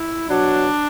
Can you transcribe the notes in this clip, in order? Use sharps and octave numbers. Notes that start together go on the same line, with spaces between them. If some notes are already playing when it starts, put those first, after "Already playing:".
Already playing: E4
B2 F#3 D4